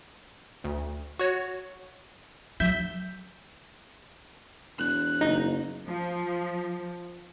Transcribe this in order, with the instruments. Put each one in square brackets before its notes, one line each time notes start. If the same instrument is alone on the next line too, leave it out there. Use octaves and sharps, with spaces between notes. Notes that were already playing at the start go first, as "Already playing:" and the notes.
[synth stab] D2
F#4 C#5
[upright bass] F#3 [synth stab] E5 G6
[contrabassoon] E1 [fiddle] F#6
[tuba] F#1 [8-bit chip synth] D#4
[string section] F3